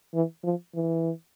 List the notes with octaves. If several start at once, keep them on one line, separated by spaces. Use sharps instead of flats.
E3
F3
E3